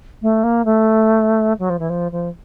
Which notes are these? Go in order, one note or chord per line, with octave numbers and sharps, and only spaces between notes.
A3
A#3
A3
F#3
F3
E3
F3
F3